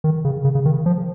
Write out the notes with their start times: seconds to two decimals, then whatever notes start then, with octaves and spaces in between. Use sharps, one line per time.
0.04 D#3
0.25 C#3
0.45 C#3
0.55 C#3
0.65 D#3
0.86 F3